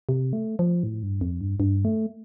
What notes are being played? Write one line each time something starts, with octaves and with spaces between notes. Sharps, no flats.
C3
A3
F3
A2
G2
F2
G2
G2
A3